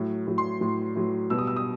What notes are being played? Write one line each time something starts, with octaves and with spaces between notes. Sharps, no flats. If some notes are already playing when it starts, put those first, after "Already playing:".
Already playing: A2 F#3
A2 F#3
C6
A2 F#3
A2 F#3
B2 G3 E6
D#6
E6
D#6